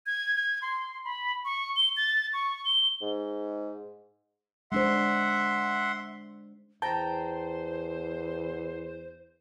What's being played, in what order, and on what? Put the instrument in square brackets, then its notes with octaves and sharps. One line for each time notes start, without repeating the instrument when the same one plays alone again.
[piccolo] G#6
G#6
C6
B5
C#6
G7
A6
C#6
G7
[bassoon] G#2
[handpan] G#3 D4 C5 [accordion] E5 F#5 C6
[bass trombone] E2 [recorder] C5 [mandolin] G5 A#5 [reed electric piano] A5